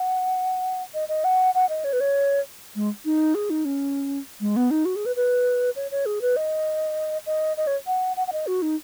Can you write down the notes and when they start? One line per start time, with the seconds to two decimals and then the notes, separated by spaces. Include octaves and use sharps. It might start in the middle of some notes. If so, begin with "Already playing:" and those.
Already playing: F#5
0.94 D#5
1.09 D#5
1.24 F#5
1.55 F#5
1.69 D#5
1.84 C#5
1.93 B4
2.00 C#5
2.75 G#3
3.05 D#4
3.35 G#4
3.50 D#4
3.65 C#4
4.41 G#3
4.56 B3
4.71 D#4
4.85 F#4
4.96 G#4
5.06 B4
5.16 B4
5.76 C#5
5.91 C#5
6.06 G#4
6.22 B4
6.36 D#5
7.26 D#5
7.57 D#5
7.67 C#5
7.87 F#5
8.17 F#5
8.27 F#5
8.33 D#5
8.47 F#4
8.62 D#4